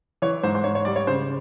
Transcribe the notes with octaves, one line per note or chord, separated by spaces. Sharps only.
E3 C#5
G#2 C5
C5
G#2 C#5
C#5
G3 D5
C#5
C#3 C5